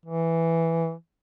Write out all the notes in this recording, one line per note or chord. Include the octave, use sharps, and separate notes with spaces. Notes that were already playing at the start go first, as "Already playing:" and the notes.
E3